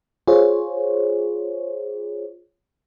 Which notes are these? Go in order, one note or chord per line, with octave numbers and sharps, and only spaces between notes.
F4 G#4 C5 C#5